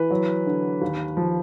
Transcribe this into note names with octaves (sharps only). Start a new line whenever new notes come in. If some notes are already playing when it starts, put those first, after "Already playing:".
Already playing: E3 B4
F#3
D3
D#2
F3